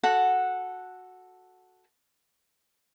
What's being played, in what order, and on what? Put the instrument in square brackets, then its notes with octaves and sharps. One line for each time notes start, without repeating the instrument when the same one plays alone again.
[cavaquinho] F#4 A4 F#5